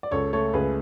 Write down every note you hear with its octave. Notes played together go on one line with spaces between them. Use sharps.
D5
C#2 A4 C#5
A3 A4 C#5
C#2 G#4 B4